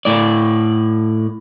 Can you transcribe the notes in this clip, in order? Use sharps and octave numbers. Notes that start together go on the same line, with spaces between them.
A2 D5